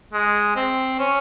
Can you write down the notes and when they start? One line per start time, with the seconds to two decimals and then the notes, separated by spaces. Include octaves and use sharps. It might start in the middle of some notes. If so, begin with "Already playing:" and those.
0.13 G#3
0.56 C4
0.99 C#4